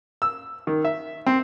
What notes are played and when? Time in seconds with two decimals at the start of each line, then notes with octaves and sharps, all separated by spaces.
0.22 E6
0.67 D#3
0.85 E5
1.27 C4